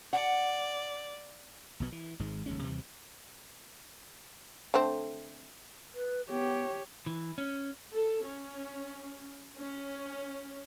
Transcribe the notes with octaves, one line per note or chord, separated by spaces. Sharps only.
D5 F#5
B1 B2 B3
E3
G#1 G#2 G#3
F1 D#2 G#3 C#4
D#2 C3 E3 G3
D3 A3 C4
B4
B3 G4 C#5
E3
C#4
A4
C#4
C#4